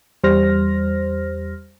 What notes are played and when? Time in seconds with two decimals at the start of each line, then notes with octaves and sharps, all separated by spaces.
0.23 E2 G3 C5 F6 A#6